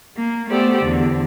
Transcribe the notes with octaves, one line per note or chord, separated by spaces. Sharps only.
A#3
A3 B3 G4 A4 C5 D5
E2 D3